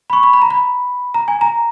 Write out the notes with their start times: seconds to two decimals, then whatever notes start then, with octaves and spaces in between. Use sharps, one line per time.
0.10 B5
0.13 C#6
0.23 B5
0.33 B5
0.42 A#5
0.50 B5
1.14 A#5
1.28 G#5
1.41 A#5